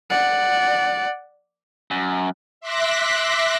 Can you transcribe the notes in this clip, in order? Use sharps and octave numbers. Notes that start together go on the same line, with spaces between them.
D5 F#5
F#2
E5 C6 D6 F#6 A#6 B6